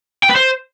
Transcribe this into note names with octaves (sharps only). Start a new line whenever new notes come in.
G5
B4
C5